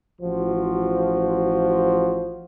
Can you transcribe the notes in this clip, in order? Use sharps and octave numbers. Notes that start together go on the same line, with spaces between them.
A1 F3 F#4 C5